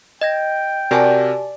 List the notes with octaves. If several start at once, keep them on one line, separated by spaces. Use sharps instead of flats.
D#5 G5 G#6 A#6
C3 F#4 G4 A#4 D5 G#5 A5